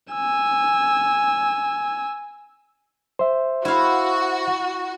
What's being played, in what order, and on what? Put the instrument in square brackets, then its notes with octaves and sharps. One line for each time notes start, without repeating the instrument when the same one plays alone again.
[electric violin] G#5 E6
[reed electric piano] C5 E5
[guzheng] E4 F5 [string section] F#4